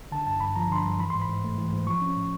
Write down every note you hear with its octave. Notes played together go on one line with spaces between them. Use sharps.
D3 A5
G2 A5
G2 B5
F3 A#5
D3 C6
B5
G2
E3 B5
G#2 C6
B5
G#2
A3
E3
G#2
F3 C#6
C#4
A2